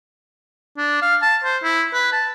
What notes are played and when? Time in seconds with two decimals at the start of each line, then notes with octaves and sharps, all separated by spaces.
0.77 D4
1.02 F5
1.22 A5
1.44 C5
1.63 E4
1.93 B4
2.13 A5